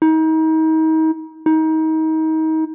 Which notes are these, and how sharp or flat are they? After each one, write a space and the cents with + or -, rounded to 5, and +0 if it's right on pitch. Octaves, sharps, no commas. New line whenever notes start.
D#4 +35
D#4 +30